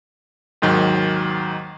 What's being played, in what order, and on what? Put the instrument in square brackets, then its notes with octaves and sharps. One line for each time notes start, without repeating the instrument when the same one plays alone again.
[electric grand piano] D#2 G#2 D#3 F#3